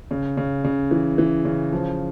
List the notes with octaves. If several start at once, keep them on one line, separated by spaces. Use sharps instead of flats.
C#3
C#3
C#3
E3
E3
C#3
F3